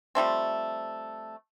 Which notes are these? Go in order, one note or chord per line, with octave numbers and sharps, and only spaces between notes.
F3 G3 A3 C4